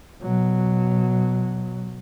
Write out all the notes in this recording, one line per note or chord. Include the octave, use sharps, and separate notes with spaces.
B2 F#3